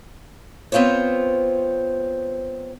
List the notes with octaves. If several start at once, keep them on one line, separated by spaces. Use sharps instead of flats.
B3 C4 F4 C5 C#5